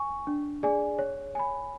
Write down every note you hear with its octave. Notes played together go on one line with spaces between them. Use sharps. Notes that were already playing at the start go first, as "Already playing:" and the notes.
Already playing: G#5 C#6
D4
G#4 D5 G#5
C#5
G#5 B5